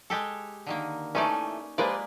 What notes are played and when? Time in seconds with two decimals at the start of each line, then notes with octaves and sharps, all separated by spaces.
0.10 G#3 G4 A4
0.66 D3 D#3 A#3
1.15 E3 A3 C#4 D#4 D5
1.78 F3 G#3 A#3 G4 B4 D5